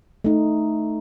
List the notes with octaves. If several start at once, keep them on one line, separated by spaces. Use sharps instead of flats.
A3 D#4